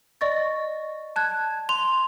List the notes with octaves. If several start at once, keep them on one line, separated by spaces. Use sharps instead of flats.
D5 D#5 C#6 A6
A5 F#6 G#6
C6 F7